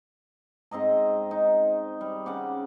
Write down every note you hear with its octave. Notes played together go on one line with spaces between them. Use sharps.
G#2 C4 D#5 A#5
D#4
G3
C#3 F#5 D6